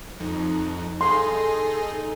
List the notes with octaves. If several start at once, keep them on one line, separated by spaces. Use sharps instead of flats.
F2 D#4
D#4 G#4 A4 C6